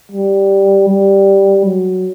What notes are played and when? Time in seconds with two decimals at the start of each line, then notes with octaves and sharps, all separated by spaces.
0.12 G3
0.88 G3
1.66 F#3